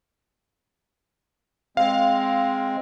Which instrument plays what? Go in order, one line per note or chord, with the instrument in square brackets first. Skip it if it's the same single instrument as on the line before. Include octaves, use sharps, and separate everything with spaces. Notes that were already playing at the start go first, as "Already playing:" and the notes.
[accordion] G#3 C4 [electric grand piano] F5